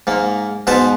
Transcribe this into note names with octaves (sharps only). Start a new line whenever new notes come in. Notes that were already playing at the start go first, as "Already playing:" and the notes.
G#2 A#3
G#2 B2 B4 C5 A5